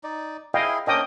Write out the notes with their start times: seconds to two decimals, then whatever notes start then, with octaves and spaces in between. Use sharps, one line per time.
0.04 D#4 D5
0.54 E4 G#4 D#5 F5 G5
0.87 A#3 C#4 D4 D#5 G5 D#6